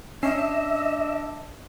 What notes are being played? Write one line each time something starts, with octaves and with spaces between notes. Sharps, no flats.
C#4 D4 D#5 E5 C7